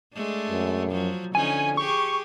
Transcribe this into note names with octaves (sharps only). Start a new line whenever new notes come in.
G#3 A3 D4
F#2
F3 F#3
D3 F3 C#4 D#4 G#5
G4 G#4 C#6